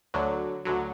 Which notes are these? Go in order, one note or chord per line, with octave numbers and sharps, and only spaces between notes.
D2 D3 F#3
D2 D3 F#3